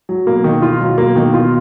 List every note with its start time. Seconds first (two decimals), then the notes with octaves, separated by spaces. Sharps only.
0.09 F#3
0.26 B2 A#3
0.44 D#3
0.62 F4
0.81 F#3
0.98 A#3
1.16 D#3
1.34 F4